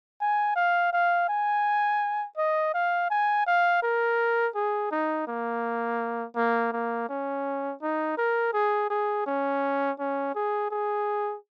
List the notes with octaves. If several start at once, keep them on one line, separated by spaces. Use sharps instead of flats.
G#5
F5
F5
G#5
D#5
F5
G#5
F5
A#4
G#4
D#4
A#3
A#3
A#3
C#4
D#4
A#4
G#4
G#4
C#4
C#4
G#4
G#4